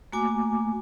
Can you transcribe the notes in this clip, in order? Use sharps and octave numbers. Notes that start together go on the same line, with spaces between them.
A3 A#3 F#4 G#5 D6